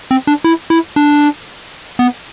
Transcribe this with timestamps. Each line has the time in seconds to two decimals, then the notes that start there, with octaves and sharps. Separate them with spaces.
0.11 C4
0.27 D4
0.44 E4
0.70 E4
0.96 D4
1.99 B3